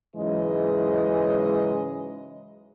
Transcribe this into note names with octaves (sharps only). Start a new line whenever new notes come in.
G#2 C#3 E3 F#3 G#3 D#5